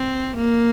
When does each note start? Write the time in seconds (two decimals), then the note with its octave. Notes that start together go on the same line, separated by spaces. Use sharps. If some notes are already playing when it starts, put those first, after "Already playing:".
Already playing: C4
0.36 A#3